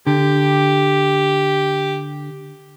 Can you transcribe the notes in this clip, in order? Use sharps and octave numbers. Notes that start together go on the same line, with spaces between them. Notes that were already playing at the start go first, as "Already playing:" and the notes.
D3 G4